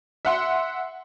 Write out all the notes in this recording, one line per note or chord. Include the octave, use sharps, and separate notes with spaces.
E5 F#5 C6